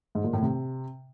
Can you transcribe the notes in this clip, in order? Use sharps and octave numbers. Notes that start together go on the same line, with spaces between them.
G#2
A#2
A2
C3